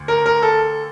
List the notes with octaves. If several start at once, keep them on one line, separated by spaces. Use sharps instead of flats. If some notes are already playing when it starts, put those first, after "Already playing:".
Already playing: D2
A#4
A#4
A4